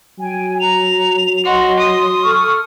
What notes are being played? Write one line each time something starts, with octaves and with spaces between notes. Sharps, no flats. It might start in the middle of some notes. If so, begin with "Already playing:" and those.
F#3 G5 G#5
A#5 F7
F#4 D#5 C6
D#6
A4 C#6 F6